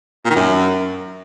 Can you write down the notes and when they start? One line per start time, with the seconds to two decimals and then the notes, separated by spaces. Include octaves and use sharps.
0.25 A#2
0.30 D#3
0.35 F#2